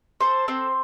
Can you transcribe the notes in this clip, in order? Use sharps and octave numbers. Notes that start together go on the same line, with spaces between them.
A4 C5
C4 C5